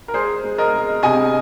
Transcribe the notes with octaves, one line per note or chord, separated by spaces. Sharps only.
A#4
G#3 G#4 C5
G#3
A#4 D#5
G#3
C3 D#5 G#5